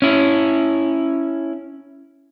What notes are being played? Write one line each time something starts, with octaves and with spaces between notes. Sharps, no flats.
C#4 E4